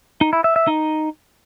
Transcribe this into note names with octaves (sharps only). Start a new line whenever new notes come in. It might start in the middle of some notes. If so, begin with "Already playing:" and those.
D#4
E4
E5
E5
D#4